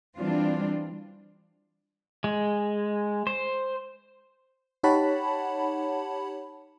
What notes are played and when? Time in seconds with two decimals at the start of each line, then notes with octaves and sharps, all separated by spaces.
0.18 E3 G3 C4 D4 F4
2.24 G#3
3.27 C5
4.83 D#4 G4 C#5 F#5 A5 B5